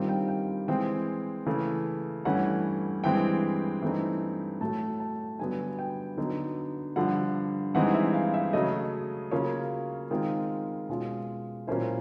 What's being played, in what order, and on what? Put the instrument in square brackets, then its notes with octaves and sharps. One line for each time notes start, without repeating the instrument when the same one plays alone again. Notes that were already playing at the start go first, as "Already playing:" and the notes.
Already playing: [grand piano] G2 D#3 G3 C4 F4
G5
G5
E3 G#3 C4 G5
C#3 E3 A3
G2 E3 A3 C#4 F#5
G2 E3 G#3 C4 G5
G2 E3 A3 C4 D#4
A2 F#3 A3 A5
A5
G2 D3 F#3 B3 G#5
G5
D3 F#3 B3 D#4
G2 D3 F3 F#5
G2 E3 G#3 C4 D#4 F#5
E5
F5
E5
C#3 F#3 A3 D#5
C#3 F#3 A#3 C#4 F4 C#5
D#3 G#3 C4 F4
B2 G#3 C#4 F4
A#2 F#3 A#3 C#4 E4 C5